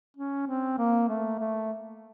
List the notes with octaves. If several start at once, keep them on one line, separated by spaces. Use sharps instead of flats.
C#4
C4
A#3
A3
A3